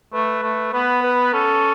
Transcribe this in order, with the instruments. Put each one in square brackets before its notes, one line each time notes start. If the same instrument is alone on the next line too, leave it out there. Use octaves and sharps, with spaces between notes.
[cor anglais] A3 [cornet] B4
[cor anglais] A3
[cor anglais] B3 [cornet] B4
[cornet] B4
[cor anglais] C#4 [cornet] A4